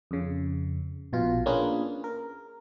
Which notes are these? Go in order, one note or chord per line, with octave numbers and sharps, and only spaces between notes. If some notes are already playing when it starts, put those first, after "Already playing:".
F2 C#3
A#1 B2 F4
A#3 C#4 D4 F4 G#4 B4
A#4